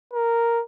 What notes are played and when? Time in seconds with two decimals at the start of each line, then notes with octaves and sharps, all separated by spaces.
0.14 A#4